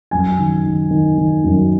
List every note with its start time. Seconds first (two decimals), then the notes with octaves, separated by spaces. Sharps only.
0.11 F#2 G#5
0.39 D#3
0.66 D#3
0.91 D#3
1.18 D#3
1.44 F#2